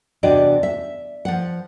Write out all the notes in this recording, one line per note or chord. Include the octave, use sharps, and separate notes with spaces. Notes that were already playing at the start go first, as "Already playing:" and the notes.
E2 C3 D4 F#4 D5 D#5
E5
F3 F#5